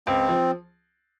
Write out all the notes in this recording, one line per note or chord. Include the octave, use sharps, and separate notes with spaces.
C#2 C4
F3